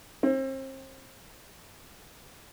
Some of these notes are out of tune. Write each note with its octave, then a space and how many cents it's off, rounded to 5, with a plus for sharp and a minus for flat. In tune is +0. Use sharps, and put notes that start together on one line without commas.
C4 +35